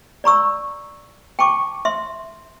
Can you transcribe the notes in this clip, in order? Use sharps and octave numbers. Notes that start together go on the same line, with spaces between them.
D5 A#5 C#6 E6
G5 A5 C#6 D6
E5 C6